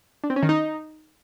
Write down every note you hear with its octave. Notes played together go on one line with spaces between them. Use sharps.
D4
C4
C#4
D#3
D#4